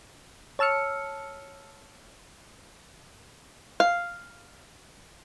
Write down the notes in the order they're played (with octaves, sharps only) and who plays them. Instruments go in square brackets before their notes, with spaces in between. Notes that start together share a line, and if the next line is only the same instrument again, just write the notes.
[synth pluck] C#5 A5 E6 F6 C#7
[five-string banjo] F5